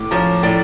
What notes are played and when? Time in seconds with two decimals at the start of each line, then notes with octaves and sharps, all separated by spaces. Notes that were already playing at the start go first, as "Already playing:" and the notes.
Already playing: A2 D6
0.11 F3 C#4 A#5
0.43 A2 D5